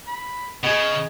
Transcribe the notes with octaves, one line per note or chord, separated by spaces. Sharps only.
B5
C#3 B3 G#4 D#5